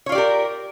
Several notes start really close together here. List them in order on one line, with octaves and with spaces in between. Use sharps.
C#5 F4 D5 G4 A#4